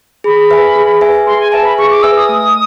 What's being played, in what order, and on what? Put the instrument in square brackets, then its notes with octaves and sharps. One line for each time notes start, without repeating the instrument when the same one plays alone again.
[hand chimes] G#4 [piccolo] B5
[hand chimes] B4 E5 G#5
G#4
B4 E5 G#5
[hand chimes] G#4 [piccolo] C6
[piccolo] G#5
[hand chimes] B4 E5 G#5 [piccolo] A5
[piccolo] B5
[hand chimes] G#4 [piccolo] C#6
[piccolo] D6
[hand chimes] B4 E5 G#5 [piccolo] E6
[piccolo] D#6
[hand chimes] A3